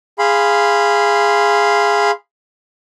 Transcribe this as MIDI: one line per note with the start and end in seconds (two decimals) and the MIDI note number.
0.19 2.11 68
0.19 2.11 77
0.19 2.11 83
0.19 2.11 84